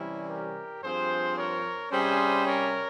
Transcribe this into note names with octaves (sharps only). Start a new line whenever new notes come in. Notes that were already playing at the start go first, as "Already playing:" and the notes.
Already playing: C3 E3 G3 C#4 E4
G4 A#4
G2 F3 C4 G#4 C5
A#4 C#5
C3 G3 C#4 G#4 C5
A#4 C#5